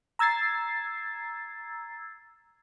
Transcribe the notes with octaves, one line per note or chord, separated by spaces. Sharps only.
A#5 E6 G#6 A6 C7